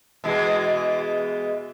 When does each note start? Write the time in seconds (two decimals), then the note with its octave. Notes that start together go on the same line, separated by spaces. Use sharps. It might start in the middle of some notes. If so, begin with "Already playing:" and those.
0.24 B2 E3 G#3